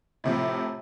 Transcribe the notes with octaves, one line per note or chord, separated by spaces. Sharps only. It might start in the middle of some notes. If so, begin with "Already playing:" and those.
A2 C3 F3